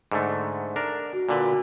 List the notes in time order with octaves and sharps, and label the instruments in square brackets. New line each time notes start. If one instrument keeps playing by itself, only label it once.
[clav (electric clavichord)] G#2 D3 A3
D4 A#4
[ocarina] F#4
[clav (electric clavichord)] A#2 D3 B4